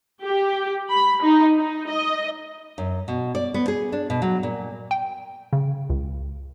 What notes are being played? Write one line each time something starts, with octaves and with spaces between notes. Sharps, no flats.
G4
B5
D#4
D#4
D#5
F#2
B2
D5
B3
G#4
D4
B2
F#3
A#2
G5
C#3
C#2